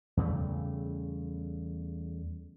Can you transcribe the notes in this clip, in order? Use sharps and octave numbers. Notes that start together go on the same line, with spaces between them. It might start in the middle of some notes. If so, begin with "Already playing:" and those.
E2 C#3 G3 A3